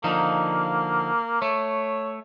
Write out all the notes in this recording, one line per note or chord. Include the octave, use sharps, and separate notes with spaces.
D3 F3 A#3 D#4
A3 C#5